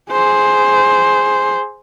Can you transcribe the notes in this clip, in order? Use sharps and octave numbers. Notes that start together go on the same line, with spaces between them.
G#4 C5